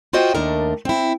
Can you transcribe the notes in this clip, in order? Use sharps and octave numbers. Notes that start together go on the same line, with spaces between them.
F4 F#4 C5 D#5 G5
D#2 A3 D4 A#4 D#5
C4 E4